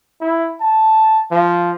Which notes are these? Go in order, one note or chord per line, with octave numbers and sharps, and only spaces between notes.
E4
A5
F3